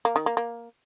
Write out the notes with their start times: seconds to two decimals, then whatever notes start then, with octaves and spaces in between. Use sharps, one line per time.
0.05 A#3
0.16 D#3
0.26 A#3
0.37 A#3